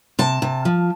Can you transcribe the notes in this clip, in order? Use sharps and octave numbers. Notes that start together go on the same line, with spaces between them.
C3 A5
C3
F3